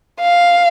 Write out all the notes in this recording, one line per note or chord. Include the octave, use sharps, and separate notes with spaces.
F5